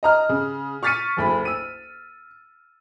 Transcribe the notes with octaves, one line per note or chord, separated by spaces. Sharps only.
D#5 A#5 F6
C#3
C#6 F6 A6 B6 C#7 D#7
F#1 D2 B5
E6 D#7